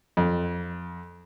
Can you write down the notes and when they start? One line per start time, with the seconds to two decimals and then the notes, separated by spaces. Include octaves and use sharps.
0.17 F2